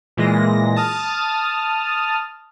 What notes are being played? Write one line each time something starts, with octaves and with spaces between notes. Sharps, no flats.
A#2 E3 G#3 A#6
A5 D#6 F6